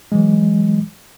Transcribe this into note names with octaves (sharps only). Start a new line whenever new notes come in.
E3 F#3 G#3